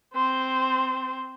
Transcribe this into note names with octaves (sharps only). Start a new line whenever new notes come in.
C4 C5